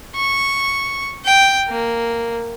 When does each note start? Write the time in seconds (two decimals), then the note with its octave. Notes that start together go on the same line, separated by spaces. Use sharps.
0.15 C#6
1.25 G5
1.69 A#3